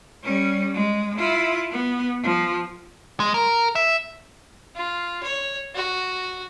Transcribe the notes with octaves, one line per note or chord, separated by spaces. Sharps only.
G3 C#4
G#3
E4 F4
B3
F3
G#3
A#4
E5
F4
C#5
F#4